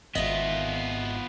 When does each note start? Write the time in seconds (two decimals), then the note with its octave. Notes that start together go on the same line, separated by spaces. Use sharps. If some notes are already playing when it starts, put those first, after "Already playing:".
0.15 G#1 B3 F4 D#5 E5